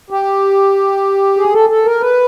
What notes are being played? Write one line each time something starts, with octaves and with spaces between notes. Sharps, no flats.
G4
G#4
A4
A4
A#4
B4